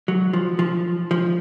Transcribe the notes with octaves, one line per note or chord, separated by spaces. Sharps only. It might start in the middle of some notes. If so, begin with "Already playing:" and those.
F#3
F3
F3
F3